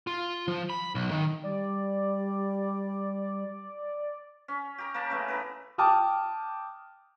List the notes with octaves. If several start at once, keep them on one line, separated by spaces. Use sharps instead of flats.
F4
F3
B5
B1
D#3
G3 D5
C#4
G4 A#4
A#3 A#4 C#5 A5
C#3 A3 B3
E4 A#4 B4
G5 A5 D6 D#6 F6